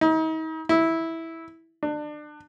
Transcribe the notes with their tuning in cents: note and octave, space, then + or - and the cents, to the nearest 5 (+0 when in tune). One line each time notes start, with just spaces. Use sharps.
D#4 +40
E4 -10
D4 +30